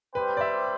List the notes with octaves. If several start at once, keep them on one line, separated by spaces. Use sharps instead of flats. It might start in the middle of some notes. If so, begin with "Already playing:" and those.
G3 C4 G4 B4 C5 G5
D5
E5